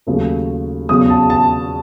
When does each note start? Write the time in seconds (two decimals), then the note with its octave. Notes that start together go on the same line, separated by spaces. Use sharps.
0.07 D#2 C#3 F#3 A3
0.89 E2 C#3 F#3 D#6
1.10 A5
1.30 A5